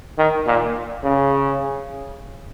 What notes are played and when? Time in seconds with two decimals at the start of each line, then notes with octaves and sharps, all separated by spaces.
0.18 D#3
0.46 A#2
1.03 C#3